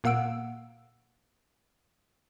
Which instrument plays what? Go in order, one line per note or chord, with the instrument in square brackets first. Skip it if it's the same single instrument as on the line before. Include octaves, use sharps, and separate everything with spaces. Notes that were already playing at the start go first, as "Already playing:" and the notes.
[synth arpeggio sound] A#2 A#3 F5 F#5 E6 D7